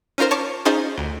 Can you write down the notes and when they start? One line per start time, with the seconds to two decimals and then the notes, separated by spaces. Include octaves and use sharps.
0.18 C#4 D#4 F4 A#4 C5
0.31 C#5 A5 C#6 D6
0.65 C#4 D#4 F4 G#4 C5 D#5
0.98 D2